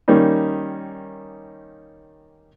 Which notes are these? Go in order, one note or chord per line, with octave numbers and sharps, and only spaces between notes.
D#3 G3 A#3 C#4 D#4